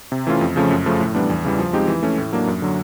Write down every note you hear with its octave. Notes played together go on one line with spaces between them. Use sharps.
C3
E3 A3 C#4 F4
F2
C#3 F3 A3 C#4
F#2
C#3 F3 A3
A2
E3 G3 B3 D4
E2
C#3 E3 G3
F3
G#3 C4 D#4 G4
E3
A3 C#4
A2
F#3 A#3 D4
F#2
D3 F#3